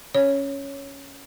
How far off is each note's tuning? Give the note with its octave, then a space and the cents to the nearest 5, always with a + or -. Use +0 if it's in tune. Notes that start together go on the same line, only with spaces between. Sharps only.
C#4 +0 C#5 +0